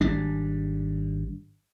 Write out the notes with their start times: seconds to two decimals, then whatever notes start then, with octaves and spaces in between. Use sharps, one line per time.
0.01 G#1 G3 D4